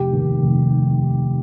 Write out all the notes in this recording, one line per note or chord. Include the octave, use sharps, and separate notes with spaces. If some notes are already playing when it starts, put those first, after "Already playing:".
Already playing: F1 G4
D#2 D#3
F1